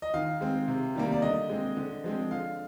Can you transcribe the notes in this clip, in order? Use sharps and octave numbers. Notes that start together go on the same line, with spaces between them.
D#5
D#3 F5
G#3 C4
C3
D#3 G3 A#3
D5
D3 D#5
G#3 C4
D3
F3 G#3 C4
D3 F5